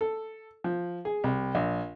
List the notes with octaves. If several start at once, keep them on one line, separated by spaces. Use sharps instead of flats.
A4
F3
G#4
C2
A#1